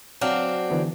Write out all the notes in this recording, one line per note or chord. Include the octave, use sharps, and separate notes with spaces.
F#3 C4 D4 C#5 F5 F6
D3 E3 B3